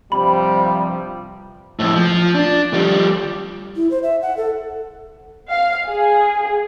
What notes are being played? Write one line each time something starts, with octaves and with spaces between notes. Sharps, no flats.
G2 C3 F3 G3 B5
F2 A2
F3
D4
F3 G3
E4
C5
E5
F#5
A4
F5
G#4